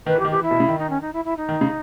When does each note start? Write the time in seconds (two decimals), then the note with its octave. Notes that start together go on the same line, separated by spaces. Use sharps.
0.06 D#3 B4
0.15 E3
0.19 G4
0.25 D#3
0.31 E3 G4
0.42 E4
0.51 B2
0.60 C#3
0.68 D#3
0.78 D#4
0.90 C#4
1.01 D#4
1.13 E4
1.25 E4
1.37 D#4
1.49 D#3
1.61 C#3